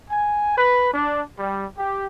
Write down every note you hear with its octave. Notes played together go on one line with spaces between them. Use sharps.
G#5
B4
D4
G3
G4